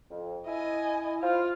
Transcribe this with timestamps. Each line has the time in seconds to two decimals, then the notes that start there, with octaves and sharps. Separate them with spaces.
0.11 F2
0.46 E4 D#5 G#5
1.22 F4 C5 F5